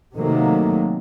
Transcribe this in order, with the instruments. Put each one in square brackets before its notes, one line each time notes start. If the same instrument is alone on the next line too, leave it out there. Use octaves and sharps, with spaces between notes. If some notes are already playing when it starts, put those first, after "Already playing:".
[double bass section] C3 D#3 F#3 A3 A#3